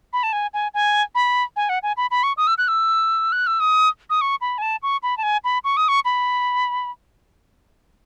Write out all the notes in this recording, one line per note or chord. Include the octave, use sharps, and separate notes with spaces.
B5
A5
G#5
G#5
G#5
B5
G#5
F#5
G#5
B5
B5
C#6
D#6
E6
F#6
E6
F#6
E6
D#6
D#6
C#6
B5
G#5
A5
C#6
B5
A5
G#5
B5
C#6
D#6
C#6
B5